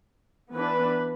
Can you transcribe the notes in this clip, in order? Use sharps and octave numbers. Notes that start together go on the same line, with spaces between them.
E3 B3 D4 B4